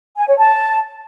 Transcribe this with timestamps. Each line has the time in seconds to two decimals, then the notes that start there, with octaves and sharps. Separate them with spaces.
0.17 G#5
0.27 C#5
0.38 A5